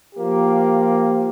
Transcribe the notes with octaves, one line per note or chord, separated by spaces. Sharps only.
F3 A#3 G4